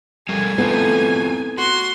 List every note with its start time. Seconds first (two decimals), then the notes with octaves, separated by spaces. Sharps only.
0.29 G3 A4 A#4 G#5
0.58 A3 B3 C4 E4 F4
1.58 F#4 C6